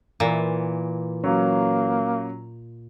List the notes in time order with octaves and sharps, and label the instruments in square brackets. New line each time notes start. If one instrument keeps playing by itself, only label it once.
[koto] A#2 [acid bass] E3
[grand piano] F#3 C#4 [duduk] A#3